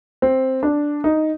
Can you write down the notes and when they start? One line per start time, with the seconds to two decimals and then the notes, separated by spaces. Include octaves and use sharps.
0.22 C4
0.63 D4
1.04 D#4